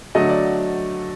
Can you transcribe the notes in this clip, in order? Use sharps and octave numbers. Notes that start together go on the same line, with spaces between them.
D3 F#3 A3 D#5
D5